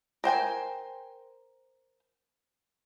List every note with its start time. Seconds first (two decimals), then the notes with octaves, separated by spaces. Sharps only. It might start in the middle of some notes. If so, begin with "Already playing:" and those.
0.24 A#4 C5 G5 G#5